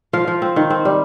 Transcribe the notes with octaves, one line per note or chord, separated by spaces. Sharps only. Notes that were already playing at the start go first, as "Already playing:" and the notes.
F3 F5
F3
C4
D#3
C4
G3